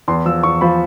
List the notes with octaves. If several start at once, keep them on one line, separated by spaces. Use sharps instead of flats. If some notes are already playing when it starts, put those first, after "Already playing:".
E2 C6
F3 E6
E2 C#6
F3 B5